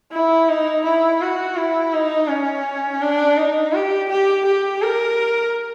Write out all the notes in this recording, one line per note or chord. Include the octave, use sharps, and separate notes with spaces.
E4
D#4
E4
F#4
E4
D#4
C#4
D4
D#4
G4
G4
G4
A#4